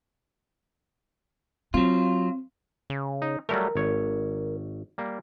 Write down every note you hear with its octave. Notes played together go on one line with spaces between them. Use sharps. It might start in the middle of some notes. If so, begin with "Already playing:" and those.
F#3 C4 F4
C#3
D#4
F#3 G3 A3 A#4
G#1 C#5
G3 A#3